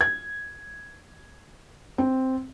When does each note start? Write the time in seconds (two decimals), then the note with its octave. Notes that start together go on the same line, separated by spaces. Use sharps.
0.01 G#6
1.98 C4